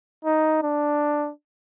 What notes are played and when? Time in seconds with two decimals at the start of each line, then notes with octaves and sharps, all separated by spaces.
0.25 D#4
0.63 D4